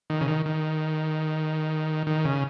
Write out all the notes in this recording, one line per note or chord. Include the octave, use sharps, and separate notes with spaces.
D#3
C#3
D#3
D#3
D#3
C#3